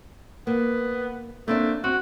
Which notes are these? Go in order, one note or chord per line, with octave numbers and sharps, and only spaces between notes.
A#3 B3
A3 A#3 C4 D4
C4 F#4